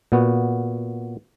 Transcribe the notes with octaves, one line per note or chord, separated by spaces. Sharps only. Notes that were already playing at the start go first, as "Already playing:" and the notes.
A#2 B3 F#4